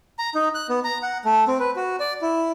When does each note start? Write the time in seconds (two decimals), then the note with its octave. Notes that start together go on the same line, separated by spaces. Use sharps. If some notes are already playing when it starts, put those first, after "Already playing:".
0.19 A#5
0.35 D#4
0.55 F#6
0.69 B3
0.84 A#5
1.03 F#5
1.25 A3
1.48 C4
1.60 B4
1.76 F#4
2.00 D5
2.22 E4